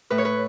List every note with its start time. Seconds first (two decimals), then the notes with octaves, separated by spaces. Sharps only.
0.10 A2 B4
0.18 C#5
0.25 B4